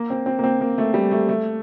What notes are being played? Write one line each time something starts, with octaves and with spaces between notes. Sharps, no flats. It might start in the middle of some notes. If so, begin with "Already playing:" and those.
Already playing: A#3
C4
C4
A#3
C4
A#3
A3
G3
A3
A3